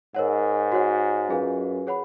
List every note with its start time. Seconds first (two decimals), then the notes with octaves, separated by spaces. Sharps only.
0.15 G#2 A#4 C#5 F#5
0.72 F#4 C#5 F#5
1.29 F#2 F4 G#4 B4 F5 G#5
1.87 G#4 C#5 F#5 B5